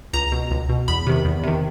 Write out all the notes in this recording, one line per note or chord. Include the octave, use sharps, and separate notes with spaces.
C#2 A#5
B2
C#2
B2
E2 B5
C3 D#3
E2
C3 D#3